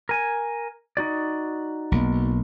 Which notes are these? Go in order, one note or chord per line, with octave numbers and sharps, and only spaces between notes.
A#4 G#5
D#4 F#4 D5
B1 A#3